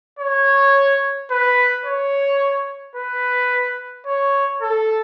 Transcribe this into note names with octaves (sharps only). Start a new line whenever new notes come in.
C#5
B4
C#5
B4
C#5
A4